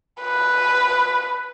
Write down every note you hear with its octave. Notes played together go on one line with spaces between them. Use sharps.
B4